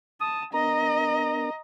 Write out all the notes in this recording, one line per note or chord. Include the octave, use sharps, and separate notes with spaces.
A5 D#6
B3 D4 A#4 D#5 A#5